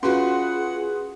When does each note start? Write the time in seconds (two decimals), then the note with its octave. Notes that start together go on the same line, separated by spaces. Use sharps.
0.03 C#4 F4 F#4 G#4 B4 F#5 C6